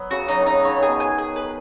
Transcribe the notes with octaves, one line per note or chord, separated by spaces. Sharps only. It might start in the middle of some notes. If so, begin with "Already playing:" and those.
Already playing: F#3 B3
C#3 F#4
F#3 D#4
D#3
D#4
C#3
C#3 C#5
D#3
G#4
B2
G#5
G#4
B4